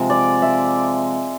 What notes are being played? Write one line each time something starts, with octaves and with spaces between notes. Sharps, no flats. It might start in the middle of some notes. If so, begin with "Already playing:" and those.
Already playing: C3 F3 G#3
D5
E5